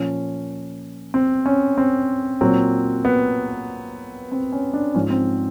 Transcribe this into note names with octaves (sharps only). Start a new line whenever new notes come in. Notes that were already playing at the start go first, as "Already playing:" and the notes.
Already playing: A#2 F3 C#4
C4
C#4
C4
A#2 F#3 C4
B3
C4
C#4
D4
G#2 F3 C#4
C4